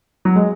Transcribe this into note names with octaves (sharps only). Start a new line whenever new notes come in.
F#3
G#3